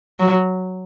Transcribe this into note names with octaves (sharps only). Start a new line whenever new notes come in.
F#3